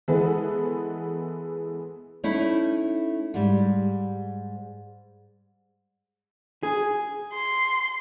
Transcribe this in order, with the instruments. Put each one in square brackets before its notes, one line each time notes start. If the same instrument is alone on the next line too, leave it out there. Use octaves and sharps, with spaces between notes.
[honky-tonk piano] E3 G#3 B3 G#4 A4 B4
[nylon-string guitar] A3 C#4 D#4 E4
G#2 G3
[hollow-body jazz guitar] G#4
[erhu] C6